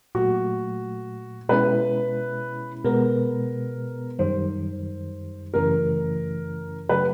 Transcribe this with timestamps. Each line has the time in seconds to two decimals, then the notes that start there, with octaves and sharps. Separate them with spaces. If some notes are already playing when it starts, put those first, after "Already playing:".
0.15 A#2 F#3 A3 F#4
1.49 B2 G#3 C#4 E4 B4
2.84 B2 G#3 B3 A#4
4.19 F#2 D#3 G3 C5
5.54 F#2 C#3 E3 A3 C#4 A#4
6.89 C#3 F#3 A3 B4